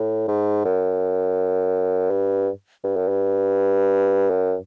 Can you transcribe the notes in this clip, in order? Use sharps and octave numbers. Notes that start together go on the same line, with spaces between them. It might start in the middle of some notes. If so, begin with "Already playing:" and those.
Already playing: A2
G#2
F#2
G2
G2
F#2
G2
F#2